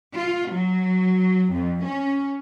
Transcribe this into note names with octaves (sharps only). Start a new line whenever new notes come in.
F4
F#3
F2
C#4